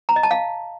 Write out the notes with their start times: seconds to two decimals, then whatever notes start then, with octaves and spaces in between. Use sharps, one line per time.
0.09 A#5
0.16 D#5
0.23 A5
0.31 F5